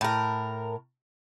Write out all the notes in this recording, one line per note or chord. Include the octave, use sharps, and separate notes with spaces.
A2 A#4